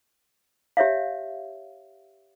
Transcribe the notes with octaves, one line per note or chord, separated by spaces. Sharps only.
G4 C#5 E5 F5